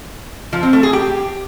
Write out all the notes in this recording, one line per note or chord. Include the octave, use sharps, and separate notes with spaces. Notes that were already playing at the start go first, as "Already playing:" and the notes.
F3
C4
A3
G#4
G4